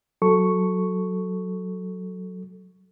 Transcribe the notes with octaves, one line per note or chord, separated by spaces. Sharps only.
F#3 A4 C#6